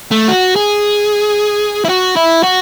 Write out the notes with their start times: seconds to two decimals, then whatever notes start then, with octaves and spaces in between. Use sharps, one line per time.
0.11 A3
0.28 F#4
0.56 G#4
1.85 E4
1.89 F#4
2.17 E4
2.43 F#4